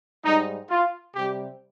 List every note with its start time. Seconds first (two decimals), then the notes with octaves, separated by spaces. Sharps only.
0.24 G#2 G3 D#4
0.69 F4
1.14 C3 G3 G4